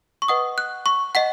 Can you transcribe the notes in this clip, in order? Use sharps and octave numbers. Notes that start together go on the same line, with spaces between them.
C#6
B4 D#5 F#5 D#6
F#6
C#6
D#5 F#5 B6